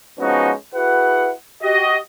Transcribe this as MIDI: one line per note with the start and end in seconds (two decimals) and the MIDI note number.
0.19 0.53 53
0.19 0.53 56
0.19 0.53 59
0.19 0.53 61
0.19 0.53 63
0.19 0.53 66
0.74 1.31 64
0.74 1.31 66
0.74 1.31 68
0.74 1.31 71
0.74 1.31 78
1.62 1.96 66
1.62 1.96 67
1.62 1.96 75